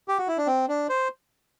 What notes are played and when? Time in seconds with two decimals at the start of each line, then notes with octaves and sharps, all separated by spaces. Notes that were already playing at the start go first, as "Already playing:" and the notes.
0.08 G4
0.18 F#4
0.28 E4
0.38 D4
0.47 C4
0.68 D4
0.89 C5